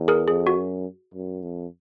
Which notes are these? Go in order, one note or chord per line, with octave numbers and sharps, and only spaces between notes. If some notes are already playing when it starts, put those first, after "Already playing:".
Already playing: E2
G#4 A#4
F2 G#4
F#4
F#2
F#2
F2